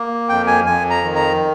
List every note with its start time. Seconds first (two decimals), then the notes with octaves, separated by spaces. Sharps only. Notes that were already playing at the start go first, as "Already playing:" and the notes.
Already playing: A#3
0.29 F2 G5
0.47 G#5
0.66 F2 G#5
0.90 A#5
1.03 D#3
1.15 A#5